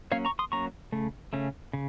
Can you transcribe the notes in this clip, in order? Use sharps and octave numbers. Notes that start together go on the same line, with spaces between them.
F#3 A#3 C#4 C#5 F5
A#5 C#6
C6 D#6
F#3 A#3 C#4 A#5 C#6
C#3 A3
C#3 A3 C#4
C#3